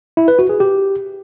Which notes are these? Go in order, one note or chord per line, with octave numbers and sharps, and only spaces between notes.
E4
B4
F#4
G#4
G4